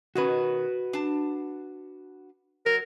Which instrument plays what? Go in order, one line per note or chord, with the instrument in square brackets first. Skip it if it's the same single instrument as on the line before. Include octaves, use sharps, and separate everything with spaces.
[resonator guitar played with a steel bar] B2 D#3 C#4 [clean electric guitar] F#4 B4
[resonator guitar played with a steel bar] D4 A5
[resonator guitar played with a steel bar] F#3 [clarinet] A#4